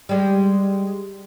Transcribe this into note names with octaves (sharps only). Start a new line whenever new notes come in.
G3 G#3